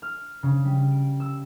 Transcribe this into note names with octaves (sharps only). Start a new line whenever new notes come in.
F6
C#3
G3
D7
E6